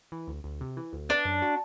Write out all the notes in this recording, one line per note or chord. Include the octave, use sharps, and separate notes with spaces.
E3
D2
D2
C3
E3
D2
B3 D4
F#2
F#4